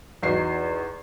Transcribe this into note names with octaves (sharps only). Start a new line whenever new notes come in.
E2 D#4 F#4 D#5 C7